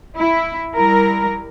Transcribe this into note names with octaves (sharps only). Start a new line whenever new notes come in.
E4
G3 E4 A#4